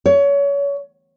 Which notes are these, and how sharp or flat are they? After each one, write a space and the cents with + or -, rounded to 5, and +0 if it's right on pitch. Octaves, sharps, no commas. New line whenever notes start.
C#5 +30